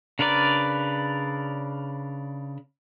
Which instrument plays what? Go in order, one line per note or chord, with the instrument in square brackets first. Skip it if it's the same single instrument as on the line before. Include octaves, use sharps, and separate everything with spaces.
[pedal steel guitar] C#3 D4 A#4 B4 D5